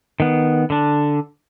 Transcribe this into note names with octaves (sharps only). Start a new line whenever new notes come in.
D#3 B3
D3 D4